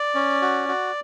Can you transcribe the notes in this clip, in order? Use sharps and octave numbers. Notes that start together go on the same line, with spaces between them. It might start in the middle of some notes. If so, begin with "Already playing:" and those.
Already playing: D5
C#4
F#4
F#4